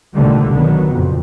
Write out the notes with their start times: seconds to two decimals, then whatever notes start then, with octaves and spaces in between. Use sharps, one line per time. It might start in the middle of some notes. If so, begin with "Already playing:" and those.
0.15 C2 A#2 D3 D#3 G3 A3
0.54 B1 B2 D#3 F#3 B3
0.89 F#1 F2 A#2